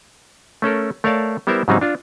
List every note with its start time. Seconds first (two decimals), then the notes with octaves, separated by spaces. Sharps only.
0.62 A3 C#4 A4 A#4
1.04 A3 A#4 C#5 D5 F5 A5
1.47 G3 B3 E4 A#4 C5 E5
1.68 G#2 C#3 F#3 G3 C4 D#4
1.81 D4 F4